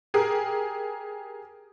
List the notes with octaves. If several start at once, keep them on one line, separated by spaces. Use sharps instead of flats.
G4 G#4 A#4